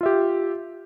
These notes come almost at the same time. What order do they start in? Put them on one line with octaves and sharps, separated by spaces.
F4 E5 G4